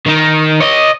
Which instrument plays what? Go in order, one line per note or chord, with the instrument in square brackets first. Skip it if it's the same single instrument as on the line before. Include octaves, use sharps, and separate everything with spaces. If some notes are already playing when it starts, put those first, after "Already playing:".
[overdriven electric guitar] D#3 D#4
C#5 D#5